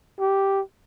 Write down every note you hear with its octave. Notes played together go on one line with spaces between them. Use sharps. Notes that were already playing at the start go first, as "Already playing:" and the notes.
G4